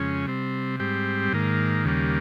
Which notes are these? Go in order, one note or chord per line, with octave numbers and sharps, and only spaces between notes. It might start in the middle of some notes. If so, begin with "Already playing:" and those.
Already playing: F2 C#3 G#3 C#4
C3 G3 C4
G#2 G3 C4 G4
G#2 D#3 A#3
D#2 C#3 G3 A#3